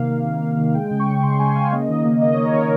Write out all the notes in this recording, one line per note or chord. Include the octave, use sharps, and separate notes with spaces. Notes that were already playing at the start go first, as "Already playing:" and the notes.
Already playing: C3 D#3 A#3 F5
A#3
D#3
A#3
D#3
G#3 G5
C#3
C#6
G#3
C#6
C#3 C6
G#3 G#5
C#3 F5
A#3 D#5
D#3
A#3
D#3 D#5
A#3 C#5
A#4
D#3